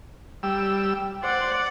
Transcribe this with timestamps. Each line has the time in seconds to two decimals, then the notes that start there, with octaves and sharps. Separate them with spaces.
0.43 G3 E6
1.23 C5 D5 F#5